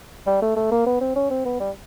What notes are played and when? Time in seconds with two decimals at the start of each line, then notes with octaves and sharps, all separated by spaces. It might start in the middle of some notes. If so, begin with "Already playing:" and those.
0.27 G3
0.42 A3
0.56 A3
0.71 A#3
0.86 B3
1.01 C4
1.16 C#4
1.30 C4
1.45 B3
1.60 G3